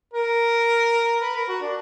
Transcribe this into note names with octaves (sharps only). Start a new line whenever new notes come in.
A#4
B4
A#4
F#4
D4